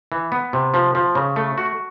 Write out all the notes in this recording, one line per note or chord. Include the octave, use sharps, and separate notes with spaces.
E3
B3
C3
F3
F3
C#3
A3
F#4